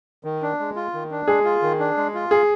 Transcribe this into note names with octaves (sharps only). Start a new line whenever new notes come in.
D#3
D4
G#3
F4
D#3
D4
G#3 G#4
F4
D#3
D4
G#3
F4
G#4